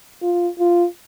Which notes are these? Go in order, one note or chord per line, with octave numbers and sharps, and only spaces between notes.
F4
F4